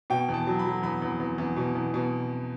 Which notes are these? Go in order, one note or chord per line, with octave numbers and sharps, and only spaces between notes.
B2 G5
E2
A5
F#3
B5
F#3
E2 B5
E2
E2
E2
B2
E2
B2